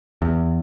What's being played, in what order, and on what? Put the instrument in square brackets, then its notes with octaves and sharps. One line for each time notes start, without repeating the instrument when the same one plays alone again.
[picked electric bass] E2